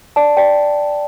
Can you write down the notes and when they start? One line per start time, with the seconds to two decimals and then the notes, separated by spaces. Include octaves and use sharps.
0.16 D5 A5
0.37 D5 G5